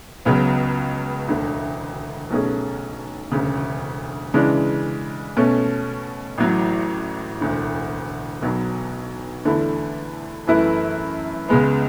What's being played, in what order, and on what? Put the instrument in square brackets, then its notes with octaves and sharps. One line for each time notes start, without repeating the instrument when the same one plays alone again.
[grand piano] C#2 C#3 F#3 B3
E1 D2 D3
B1 B2 A3 C#4 G#4
E1 D2 C#3
C#3 E3 G#3 D4
B2 A3 C#4
A1 A2 F#3
E1 D2 D3
B1 B2 F#3 B3
E2 D3 A3 E4
F#2 E3 A3 E4 B4
C#2 C#3 G#3 B3